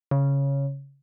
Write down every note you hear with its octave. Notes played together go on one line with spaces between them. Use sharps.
C#3